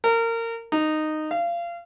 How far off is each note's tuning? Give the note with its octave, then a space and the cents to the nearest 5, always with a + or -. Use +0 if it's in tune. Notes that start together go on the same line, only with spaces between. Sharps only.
A#4 -25
D#4 -10
F5 -25